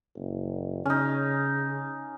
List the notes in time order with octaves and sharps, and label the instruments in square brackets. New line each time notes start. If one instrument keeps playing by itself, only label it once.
[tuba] F#1
[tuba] C#3 [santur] C#4 D#4